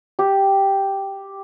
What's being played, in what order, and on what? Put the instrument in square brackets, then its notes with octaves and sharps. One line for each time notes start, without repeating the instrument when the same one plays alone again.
[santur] G4